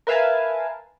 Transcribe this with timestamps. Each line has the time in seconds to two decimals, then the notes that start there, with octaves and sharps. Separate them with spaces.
0.07 A#4 B4 E5 F5 G#5 A5